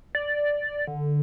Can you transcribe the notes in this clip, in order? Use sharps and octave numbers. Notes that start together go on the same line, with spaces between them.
D5
D3